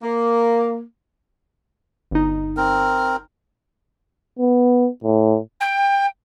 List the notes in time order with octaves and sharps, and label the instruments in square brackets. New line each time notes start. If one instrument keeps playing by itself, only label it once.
[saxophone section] A#3
[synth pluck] G1 D#4
[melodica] C4 A#4
[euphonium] B3
A2
[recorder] G5